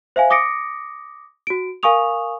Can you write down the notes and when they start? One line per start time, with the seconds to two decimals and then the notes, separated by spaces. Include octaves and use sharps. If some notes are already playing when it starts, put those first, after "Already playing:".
0.16 C5 E5 F5 G#5
0.30 D6 D#6 A#6 C#7 D7
1.47 F#4 D7
1.83 A#4 F5 G#5 C#6 D#6 F7